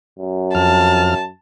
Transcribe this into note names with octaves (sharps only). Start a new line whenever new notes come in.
F#2
F2 A5 F6